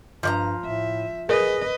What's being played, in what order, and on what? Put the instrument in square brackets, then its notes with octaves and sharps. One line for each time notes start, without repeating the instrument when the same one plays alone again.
[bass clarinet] G2 [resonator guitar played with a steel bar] F3 D5 A#5
[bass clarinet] A2 [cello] E5
[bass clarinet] G#4 [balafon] A#4 [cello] B4 D#5